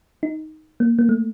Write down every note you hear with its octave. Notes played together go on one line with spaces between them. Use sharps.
D#4
A#3
A#3
A3